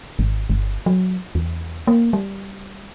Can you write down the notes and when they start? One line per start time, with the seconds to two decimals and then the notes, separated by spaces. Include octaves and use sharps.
0.19 G#1
0.50 G1
0.86 F#3
1.35 E2
1.87 A#3
2.13 G3